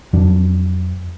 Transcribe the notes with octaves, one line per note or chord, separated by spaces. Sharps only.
F2 F#3 D4